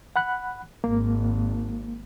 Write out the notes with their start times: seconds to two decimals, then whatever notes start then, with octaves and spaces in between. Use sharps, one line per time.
0.16 F#5 B5 F#6
0.84 G#1 A#3